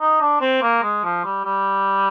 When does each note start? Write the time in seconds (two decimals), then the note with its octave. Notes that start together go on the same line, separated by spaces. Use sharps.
0.01 D#4
0.21 D4
0.41 C4
0.62 A#3
0.83 G#3
1.04 F3
1.24 G3
1.45 G3